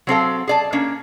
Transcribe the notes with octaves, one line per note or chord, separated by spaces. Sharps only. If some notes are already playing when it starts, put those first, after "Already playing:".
F#3 C4 A4 F5
G#4 D5 A5
A#3 C#4 D4